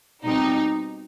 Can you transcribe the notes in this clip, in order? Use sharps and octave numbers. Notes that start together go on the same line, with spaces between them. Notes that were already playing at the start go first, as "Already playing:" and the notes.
B2 G3 C4 D#4 G4